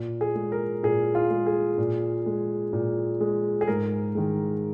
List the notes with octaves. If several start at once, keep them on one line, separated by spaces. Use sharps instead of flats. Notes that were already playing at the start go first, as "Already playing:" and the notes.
Already playing: A#2
G#4
G#3
A#4
A#2 G#4
F4
G#3
G#4
A#2
G#3
A#2
G#3
G#4
G#2 A#4
D#3 G#3